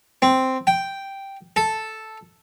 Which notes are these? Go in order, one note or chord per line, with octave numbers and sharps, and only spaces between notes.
C4
G5
A4